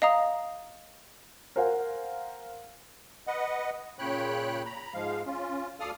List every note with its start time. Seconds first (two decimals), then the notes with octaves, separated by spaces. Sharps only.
0.02 D#5 F5 A#5 D#6
1.56 A#4 C5 F5 F#5 G#5
3.27 B4 D#5 F#5
3.99 A#2 C#3 C#5 G5 B5 F#6
4.65 A#5 B5
4.94 G#2 F3 G#3 F5
5.26 C#4 F4
5.80 D2 A4 D5 F5 D#6 F6